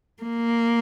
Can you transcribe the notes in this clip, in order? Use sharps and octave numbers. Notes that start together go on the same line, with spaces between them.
A#3